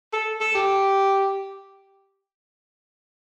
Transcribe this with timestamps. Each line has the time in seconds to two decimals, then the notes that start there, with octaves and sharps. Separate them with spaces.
0.13 A4
0.41 A4
0.55 G4